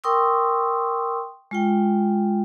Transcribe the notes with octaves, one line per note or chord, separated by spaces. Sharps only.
A#4 G5 C6 C#6 D#6 E6
G#3 F4 G5